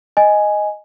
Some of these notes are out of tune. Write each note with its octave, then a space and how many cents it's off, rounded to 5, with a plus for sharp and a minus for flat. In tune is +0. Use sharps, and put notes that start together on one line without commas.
D#5 +0 G#5 +0